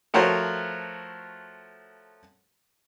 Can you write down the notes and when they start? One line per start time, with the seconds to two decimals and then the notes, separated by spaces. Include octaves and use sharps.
0.14 F3 A3 F#4 A#4 C5 C#5